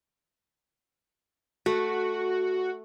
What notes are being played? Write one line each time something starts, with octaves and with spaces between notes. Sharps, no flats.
A3 F#4